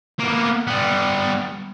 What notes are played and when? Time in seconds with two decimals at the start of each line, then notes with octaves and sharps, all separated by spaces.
0.20 A#3 B3
0.67 G3 B3